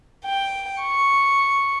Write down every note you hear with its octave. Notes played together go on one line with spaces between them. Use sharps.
G5
C#6